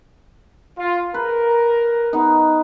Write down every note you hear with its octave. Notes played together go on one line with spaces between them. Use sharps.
F4
A#4 B4
B3 D#4